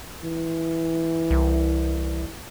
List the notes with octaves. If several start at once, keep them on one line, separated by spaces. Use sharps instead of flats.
E3
C2